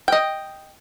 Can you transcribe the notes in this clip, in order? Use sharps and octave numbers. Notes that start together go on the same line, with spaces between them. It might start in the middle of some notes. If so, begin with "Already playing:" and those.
D#5 G5